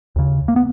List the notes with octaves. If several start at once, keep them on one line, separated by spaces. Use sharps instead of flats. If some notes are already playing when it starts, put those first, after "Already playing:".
D#2 C#3
A#3
B3